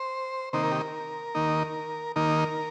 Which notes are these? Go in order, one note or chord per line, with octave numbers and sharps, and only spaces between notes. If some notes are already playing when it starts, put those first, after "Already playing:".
Already playing: C5
C3 D#3 A#3 D#4 C5
A#4
G4
A#4
D#2 D#3 A#3 D#4
D#2 D#3 A#3 D#4 A#4